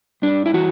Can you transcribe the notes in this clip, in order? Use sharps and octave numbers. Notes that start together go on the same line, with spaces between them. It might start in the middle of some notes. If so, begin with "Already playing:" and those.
G2 D4
E4
E3 F#4